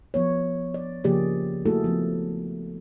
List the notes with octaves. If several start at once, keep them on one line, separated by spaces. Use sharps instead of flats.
F3 B3 C#5
D5
C#3 F3 A#3 G4 G#4 D5
A3 A#3 E4 F#4 G#4 A4
F3 B3